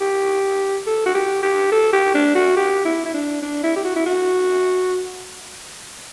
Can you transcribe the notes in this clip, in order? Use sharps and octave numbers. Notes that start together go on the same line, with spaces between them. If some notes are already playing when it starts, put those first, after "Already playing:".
G4
A4
F#4
G4
G4
A4
G4
D4
F#4
G4
E4
E4
D4
D4
E4
G4
F#4
E4
F#4